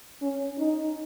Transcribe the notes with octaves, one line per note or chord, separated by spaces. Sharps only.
C#4
D#4